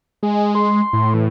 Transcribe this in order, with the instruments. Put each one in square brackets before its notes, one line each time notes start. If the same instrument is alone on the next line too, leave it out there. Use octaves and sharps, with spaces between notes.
[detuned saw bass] G#3 [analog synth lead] G#4
[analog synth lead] C6
[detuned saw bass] A2
[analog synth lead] E3